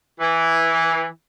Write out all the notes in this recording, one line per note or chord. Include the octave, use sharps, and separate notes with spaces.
E3